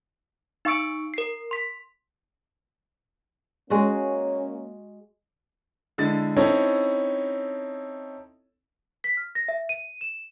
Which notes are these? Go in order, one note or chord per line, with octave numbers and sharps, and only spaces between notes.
D#4 F5 C#6 E6 C#7 D7
A#4 C7
C6 B6
G#3 A#3 C#4 F#4
D3 G#3 E4 A6
C4 C#4 D#4 E4 A4 C#5
B6
F6
A#6
E5
D#7
E7